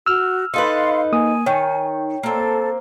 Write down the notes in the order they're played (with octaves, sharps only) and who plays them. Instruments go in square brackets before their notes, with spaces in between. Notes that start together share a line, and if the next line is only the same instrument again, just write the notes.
[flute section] F#4 [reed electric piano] E6 F6
[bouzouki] D#4 A4 B4 [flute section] F5 C6
[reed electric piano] A#3 D#6 [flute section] G#5
[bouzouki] D#3 [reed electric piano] C#5 G5
[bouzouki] A#3 C4 [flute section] A4